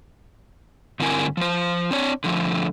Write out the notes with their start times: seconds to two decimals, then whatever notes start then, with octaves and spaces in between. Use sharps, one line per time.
1.00 G2 D3 C4 E4 A#4 G#5
1.37 F3 C5
1.91 C4 D4 C#5
2.24 D3 F3 A3